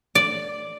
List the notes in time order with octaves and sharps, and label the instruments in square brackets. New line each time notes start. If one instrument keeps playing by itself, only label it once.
[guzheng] D5